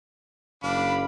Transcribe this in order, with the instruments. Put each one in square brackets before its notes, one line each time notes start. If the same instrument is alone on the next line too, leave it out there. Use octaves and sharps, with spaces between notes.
[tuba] F#1 [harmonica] D4 [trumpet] F5 [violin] B5